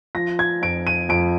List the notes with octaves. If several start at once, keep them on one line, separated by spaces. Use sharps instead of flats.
F3 A#6
G#6
F2 D7
D#7
F2 D7